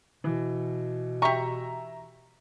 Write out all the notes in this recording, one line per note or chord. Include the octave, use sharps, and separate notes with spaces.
B2 E3
G4 E5 A#5 C#6